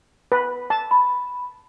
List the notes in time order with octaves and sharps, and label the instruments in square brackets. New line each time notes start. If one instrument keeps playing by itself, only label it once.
[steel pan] B4
A5
[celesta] B5